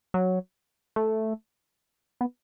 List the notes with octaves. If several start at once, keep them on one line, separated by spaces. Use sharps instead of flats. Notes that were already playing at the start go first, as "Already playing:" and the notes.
F#3
A3
B3